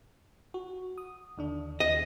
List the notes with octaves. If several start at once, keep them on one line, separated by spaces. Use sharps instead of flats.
F#4
D#6
D#2 D3 D4
D#2 D#5